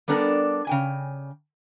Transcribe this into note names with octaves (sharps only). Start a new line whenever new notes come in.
G3 B3 D4 A4 A#4 D5
C#3 G5 G#5